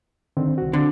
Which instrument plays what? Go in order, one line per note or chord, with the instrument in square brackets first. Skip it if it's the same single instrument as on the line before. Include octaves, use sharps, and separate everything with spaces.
[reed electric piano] D3 D#3 C4
C2 F#4
[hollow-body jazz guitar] D3 [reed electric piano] C4